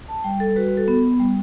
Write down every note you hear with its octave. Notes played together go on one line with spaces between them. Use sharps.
A5
G3 G5
A4
F#4 B4
A4
B3
G3